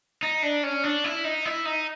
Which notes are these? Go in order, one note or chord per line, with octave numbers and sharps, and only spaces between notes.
D#4
D4
C#4
D4
E4
D#4
E4
D#4